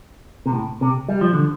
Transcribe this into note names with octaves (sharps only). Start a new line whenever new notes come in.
C3
A2
C3
G3
F3
D3